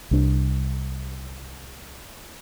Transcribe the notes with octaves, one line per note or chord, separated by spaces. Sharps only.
C2 D4